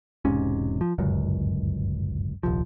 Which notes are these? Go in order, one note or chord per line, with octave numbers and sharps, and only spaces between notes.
E1 G#2 C3 C#4
F3
D1 G1 C#2 F#2
D#1 C2 F3